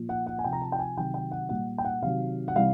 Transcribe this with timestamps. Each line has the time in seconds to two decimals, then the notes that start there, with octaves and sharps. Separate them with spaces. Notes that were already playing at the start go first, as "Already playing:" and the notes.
Already playing: A#2 F3
0.09 F#5
0.26 F#5
0.39 G#5
0.44 C3 F3 G5
0.53 A#5
0.62 A5
0.72 G5
0.79 G#5
0.97 C3 D#3 F#3 G5
1.14 G5
1.31 F#5
1.49 A#2 G3 F#5
1.78 G5
1.85 F#5
2.02 C3 D#3 F#3 F5
2.48 F#5
2.55 C3 E3 G3 F5